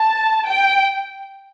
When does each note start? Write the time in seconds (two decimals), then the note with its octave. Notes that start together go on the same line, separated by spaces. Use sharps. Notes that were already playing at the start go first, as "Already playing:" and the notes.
Already playing: A5
0.48 G5